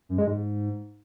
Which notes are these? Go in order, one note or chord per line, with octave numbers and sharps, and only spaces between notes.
F#2
G#3
G#2